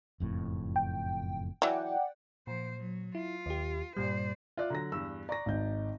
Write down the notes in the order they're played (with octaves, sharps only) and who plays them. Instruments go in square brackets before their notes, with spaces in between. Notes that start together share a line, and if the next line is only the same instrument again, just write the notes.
[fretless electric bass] F#1 F2 A2
[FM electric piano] G5
[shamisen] E3 F#3 [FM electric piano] D5 F#5 G5
[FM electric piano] A#2 [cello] F3 C5
[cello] F#3
[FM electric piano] E4 [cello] F4
[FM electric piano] D#2 G4
[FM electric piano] G2 A#2 G3 [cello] C5 D5
[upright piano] F4 D5 [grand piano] E5 F#6
[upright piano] D3 F#3 [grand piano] A#5 A#6
[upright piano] E2 G2 [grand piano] E6
[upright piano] D5 [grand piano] A#5 C#6 A#6
[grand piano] G#1 D#4 G6